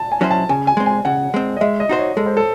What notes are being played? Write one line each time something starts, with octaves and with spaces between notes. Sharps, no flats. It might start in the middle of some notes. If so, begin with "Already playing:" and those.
Already playing: A5
G#5
F#3 C#4 E4 C5
A5
C#3 G#5
G#5
G#3 C4
G#5
C#3 F#5
G#3 C4
D#5
G#3 E5
D#5
D#4 F#4 C5
C#5
G#3 A4
C5
A4